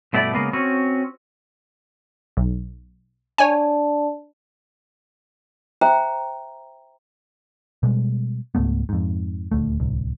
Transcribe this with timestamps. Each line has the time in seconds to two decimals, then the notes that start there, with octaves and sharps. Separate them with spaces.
0.13 G2 B2 A3 E4 D5
0.33 C#3 G#3 A#3 B3
0.53 C4 C#4 F#4
2.37 B1
3.38 D4 C#5 D5 G#5 A5
5.81 C5 E5 G5 A#5
7.83 B2 G3 G#3
8.55 C#2 G#2 A3 B3
8.89 F2 G#2
9.52 D#1 D2 A3
9.80 D1 C2